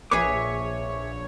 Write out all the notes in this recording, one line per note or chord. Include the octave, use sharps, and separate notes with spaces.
A#1 G#4 B4 C#5 E5 G#5 D6